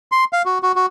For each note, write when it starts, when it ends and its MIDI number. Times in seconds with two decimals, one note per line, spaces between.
0.12 0.24 84
0.33 0.42 77
0.45 0.58 66
0.63 0.72 66
0.76 0.86 66